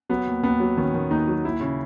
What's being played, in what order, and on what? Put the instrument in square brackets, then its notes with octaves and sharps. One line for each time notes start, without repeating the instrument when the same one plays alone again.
[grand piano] F#3 B3
D#2
D#2 B3
F#3
D#3 C#4
D#3
D#2 D#4
F#3
D#2 E4
C#3